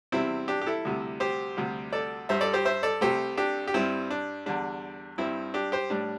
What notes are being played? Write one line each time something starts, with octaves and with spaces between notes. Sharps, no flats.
E2 C3 G3 C4 E4
D4 G4
G4
E4 A4
D2 C3 G3
G4 C5
D2 C3 G3
A4 D5
G2 G3 C5 E5
A4 D5
G4 C5
C5 E5
A4 D5
C2 C3 A3 G4 C5
D4 G4
G4
G2 G3 C4 E4
D4
E2 D3 G3 D4
G2 G3 C4 E4
D4 G4
G4 C5
A2 G3 D4